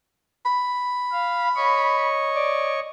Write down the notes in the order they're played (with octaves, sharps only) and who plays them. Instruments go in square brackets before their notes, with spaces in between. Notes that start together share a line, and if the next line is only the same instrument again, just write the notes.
[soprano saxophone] B5
[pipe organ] F5
C#5 D#5 C#6
[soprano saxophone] D5